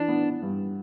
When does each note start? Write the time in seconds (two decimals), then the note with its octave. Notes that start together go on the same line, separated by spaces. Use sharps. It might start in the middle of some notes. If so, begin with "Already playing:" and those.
Already playing: E3 D4
0.08 B3
0.42 G2